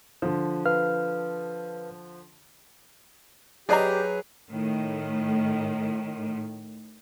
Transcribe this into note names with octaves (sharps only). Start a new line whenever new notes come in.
D3 F3
B4 F5 F6
F#3 G4 G#4 B4 D5 D#5 A#5
A2 D#3